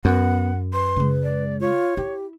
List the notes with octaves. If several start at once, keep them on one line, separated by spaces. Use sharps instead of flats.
F#2 B3 F#5
B4 C6
C#3 G#3
D5
F4 C#5
E4 G4